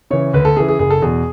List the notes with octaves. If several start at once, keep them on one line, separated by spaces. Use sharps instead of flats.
C#3 E3 C#5
D2 B4
A4
C#3 E3 G#4
G#4
F#1 G#4
A4
E2 B2 G#4